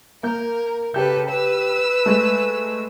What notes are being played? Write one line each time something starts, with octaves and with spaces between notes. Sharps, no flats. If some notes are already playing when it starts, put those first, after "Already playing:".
A#3 A#4 G6
C#3 G4 A4 B4 G6
B4 E6
G#3 A3